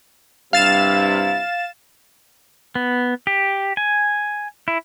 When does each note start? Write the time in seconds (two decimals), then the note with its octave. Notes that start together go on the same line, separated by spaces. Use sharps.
0.53 G2 C3 E4 F5 A6 E7
2.75 B3
3.27 G4
3.77 G#5
4.68 E4